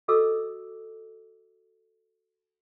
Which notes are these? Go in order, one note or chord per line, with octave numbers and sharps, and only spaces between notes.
F#4 A4 D#5 D6 E6